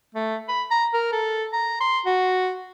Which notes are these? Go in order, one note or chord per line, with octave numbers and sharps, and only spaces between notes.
A3
B5
A#5
A#4
A4
A#5
C6
F#4